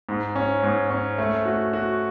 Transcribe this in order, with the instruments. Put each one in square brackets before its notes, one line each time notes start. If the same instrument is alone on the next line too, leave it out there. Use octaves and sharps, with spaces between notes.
[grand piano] G#2
C#4
G#2
C#4
A3
F#4
F#4